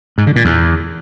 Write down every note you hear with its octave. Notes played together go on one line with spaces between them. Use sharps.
G#2
D3
A#2
E2